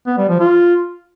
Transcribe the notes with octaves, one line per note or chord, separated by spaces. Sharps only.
B3
G3
F3
F4